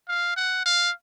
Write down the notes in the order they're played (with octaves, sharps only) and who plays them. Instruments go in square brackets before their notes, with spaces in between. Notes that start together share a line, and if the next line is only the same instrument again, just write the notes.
[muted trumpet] F5
F#5
F5